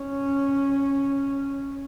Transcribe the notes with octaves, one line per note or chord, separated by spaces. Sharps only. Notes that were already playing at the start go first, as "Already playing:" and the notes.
Already playing: C#4